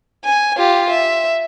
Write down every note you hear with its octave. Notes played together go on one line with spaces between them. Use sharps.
G#5
F4 G4
E5